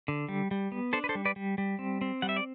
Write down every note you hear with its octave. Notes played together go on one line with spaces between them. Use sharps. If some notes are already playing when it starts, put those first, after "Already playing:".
D3
G3
G3
B3
D4 A4 C5
B4
A4 C5
G3
B4 D5
G3
G3
C4
C4
G3 F#5
E5
D5